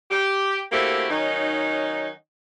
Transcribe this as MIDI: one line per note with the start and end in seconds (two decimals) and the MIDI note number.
0.10 0.59 67
0.72 1.06 57
0.72 1.06 58
0.72 1.06 60
0.72 1.06 64
0.72 1.06 66
0.72 1.06 67
1.10 2.10 51
1.10 2.10 54
1.10 2.10 61
1.10 2.10 63